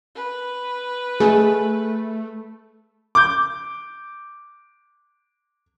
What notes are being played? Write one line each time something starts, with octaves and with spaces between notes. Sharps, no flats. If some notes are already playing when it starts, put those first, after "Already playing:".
B4
A3 G#4
D6 G6